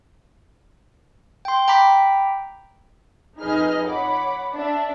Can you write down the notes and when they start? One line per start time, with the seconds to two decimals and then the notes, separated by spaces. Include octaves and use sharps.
1.45 G5 C6
1.68 G5 A#5 B5 D6 B6
3.40 F2 D#4 G#4 B4 D#5 F6
3.88 C#5 F#5 B5 D6
4.53 D4 E5